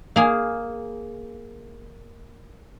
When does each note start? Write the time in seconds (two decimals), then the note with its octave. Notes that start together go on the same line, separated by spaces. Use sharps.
0.16 A#3 G#4